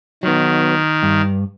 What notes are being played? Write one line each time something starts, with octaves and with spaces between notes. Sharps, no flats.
D#3 F#3 B3
G2